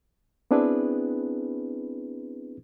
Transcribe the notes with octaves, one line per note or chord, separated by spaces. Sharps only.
B3 C4 D4 E4 G#4 B4